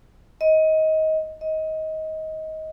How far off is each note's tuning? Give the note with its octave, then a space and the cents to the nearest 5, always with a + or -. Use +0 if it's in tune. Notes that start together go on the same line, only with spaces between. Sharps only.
D#5 +20
D#5 +20